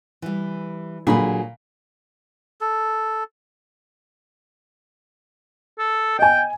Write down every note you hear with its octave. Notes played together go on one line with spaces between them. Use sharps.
E3 G3
A#2 D3 F#3 G#4 B5
A4
A4
D#5 G5 G#5